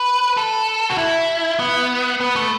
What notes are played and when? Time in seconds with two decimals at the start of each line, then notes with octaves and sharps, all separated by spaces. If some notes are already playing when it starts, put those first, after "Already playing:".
Already playing: B4
0.37 A4
0.90 F#4
0.98 E4
1.59 B3
2.20 B3
2.36 A3